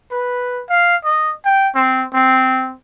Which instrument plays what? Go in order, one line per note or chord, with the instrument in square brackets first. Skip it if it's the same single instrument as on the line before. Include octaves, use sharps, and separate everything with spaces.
[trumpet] B4
F5
D#5
G5
C4
C4